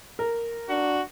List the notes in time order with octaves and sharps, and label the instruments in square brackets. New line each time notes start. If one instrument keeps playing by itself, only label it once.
[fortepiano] A#4
[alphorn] D4 [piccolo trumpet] F#4